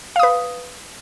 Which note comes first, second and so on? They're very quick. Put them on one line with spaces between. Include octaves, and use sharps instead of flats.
F5 D#6 B4